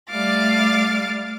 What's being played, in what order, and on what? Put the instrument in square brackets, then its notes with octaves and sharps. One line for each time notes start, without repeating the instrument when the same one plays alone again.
[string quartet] G3 A3 D5 F5 D6 A6